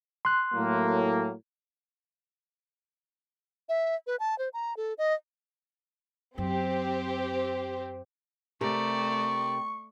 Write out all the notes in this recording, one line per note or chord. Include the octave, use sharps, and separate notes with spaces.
C6 F#6
A2 F#3 A#3
E5
B4
A5
C5
A#5
A4
D#5
F#2 C4 G4 C5
C3 A3 G4 A#4 D5 C#6